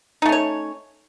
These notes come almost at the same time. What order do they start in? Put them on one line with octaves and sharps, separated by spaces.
D#4 A3 C#4 C#5